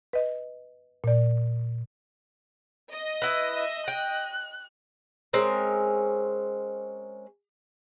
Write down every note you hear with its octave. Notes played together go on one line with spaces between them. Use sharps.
B4 D#5
A#2 D5
D#5
E4 B4
E5
G5 F#6
G#3 C4 C#4 A#4